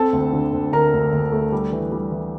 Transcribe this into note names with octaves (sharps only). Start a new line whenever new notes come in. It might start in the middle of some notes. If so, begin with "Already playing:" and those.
Already playing: C4 A4 A5
D2
D3
D2
D3 A#4 A#5
D2
D2
A3
G3
E3
G3
E3